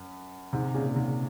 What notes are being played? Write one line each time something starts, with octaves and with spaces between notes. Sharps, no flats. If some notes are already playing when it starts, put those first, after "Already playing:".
Already playing: F#2
G#2 C3
A#2 C#3
G#2 C3